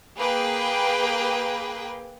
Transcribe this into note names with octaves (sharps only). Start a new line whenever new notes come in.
A#3 G#4 B4 G5